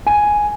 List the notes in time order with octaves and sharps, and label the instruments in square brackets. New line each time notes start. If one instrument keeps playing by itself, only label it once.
[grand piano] G#5